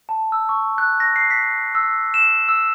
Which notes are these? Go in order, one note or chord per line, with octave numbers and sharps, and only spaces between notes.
A5
E6
C#6
F#6
A#6
C7
B6
E6
E7
E6